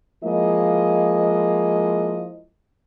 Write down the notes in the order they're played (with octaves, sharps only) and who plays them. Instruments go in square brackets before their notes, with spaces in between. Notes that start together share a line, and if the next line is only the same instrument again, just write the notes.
[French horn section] F3 G#3 A#3 E4 D#5